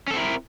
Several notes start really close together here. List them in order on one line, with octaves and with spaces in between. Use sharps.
C#4 A4 C4 E4 A#4